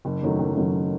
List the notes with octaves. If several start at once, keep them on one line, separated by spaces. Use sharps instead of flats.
F#1
F#2 D#3 F#3 A3
F#1
F#2 D#3 F#3 A3